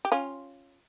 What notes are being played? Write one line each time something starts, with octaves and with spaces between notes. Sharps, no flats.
G4
C#4 F4